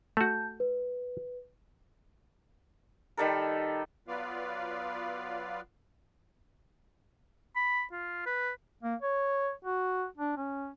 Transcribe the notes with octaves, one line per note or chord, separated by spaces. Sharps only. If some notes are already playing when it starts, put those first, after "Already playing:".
A3 F#4 A5 G6
B4
D#3 G3 A4 A#4
F#3 B3 F4 B4 D5 F5
B5
F4
B4
A#3
C#5
F#4
D4
C#4